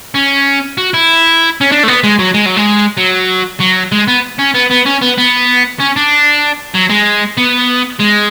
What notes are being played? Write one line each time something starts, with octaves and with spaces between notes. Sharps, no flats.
C#4
F#4
E4
C#4
D4
A3
B3
G#3
F#3
G#3
F#3
G#3
F#3
F#3
G#3
B3
C#4
B3
B3
C#4
B3
B3
C#4
D4
F#3
G#3
B3
G#3